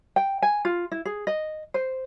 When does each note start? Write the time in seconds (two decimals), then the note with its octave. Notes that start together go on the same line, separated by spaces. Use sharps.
0.16 G5
0.42 G#5
0.65 F4
0.92 E4
1.05 G#4
1.27 D#5
1.74 C5